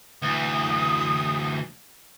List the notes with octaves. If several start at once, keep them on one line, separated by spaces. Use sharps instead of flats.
D2 E3 D#6